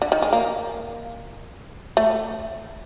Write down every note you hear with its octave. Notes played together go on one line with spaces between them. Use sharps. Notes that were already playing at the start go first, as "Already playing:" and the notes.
D3
D#3
G#3
A#3
A3